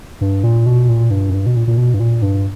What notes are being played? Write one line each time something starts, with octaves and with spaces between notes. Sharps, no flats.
G2
A#2
B2
A#2
G2
F#2
G2
B2
A#2
A#2
B2
G2
A#2
G2